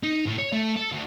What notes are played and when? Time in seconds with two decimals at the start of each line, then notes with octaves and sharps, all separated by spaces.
0.03 D#4
0.26 A2
0.38 C#5
0.52 A3
0.76 A4
0.92 D2